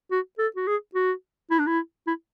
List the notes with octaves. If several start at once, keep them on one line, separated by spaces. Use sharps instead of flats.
F#4
A4
F#4
G#4
F#4
E4
D4
E4
E4